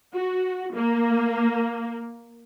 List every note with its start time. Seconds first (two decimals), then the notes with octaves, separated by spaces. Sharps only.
0.14 F#4
0.75 A#3